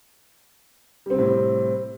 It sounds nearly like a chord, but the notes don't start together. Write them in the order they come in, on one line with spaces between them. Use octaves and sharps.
G3 C4 C3 A2